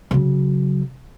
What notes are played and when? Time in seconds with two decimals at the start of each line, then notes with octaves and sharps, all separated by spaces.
0.11 C#3 F#3